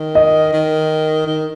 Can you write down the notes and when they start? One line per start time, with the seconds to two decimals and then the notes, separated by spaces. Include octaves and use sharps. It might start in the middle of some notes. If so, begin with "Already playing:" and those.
Already playing: D#3
0.15 D#5
0.53 D#3
1.27 D#3